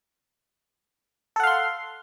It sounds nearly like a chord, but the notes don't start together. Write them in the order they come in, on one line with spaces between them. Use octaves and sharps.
A4 F#5 F5 C6